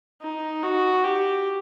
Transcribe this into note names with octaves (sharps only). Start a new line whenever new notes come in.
D#4
F#4
G4